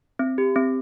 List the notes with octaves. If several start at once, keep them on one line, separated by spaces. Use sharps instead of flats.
C4
G4
C4